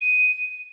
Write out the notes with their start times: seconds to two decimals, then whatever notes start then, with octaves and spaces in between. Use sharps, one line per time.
0.01 D#7